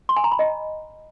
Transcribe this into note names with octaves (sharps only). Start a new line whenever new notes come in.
C6
G#5
A#5
B5
D#5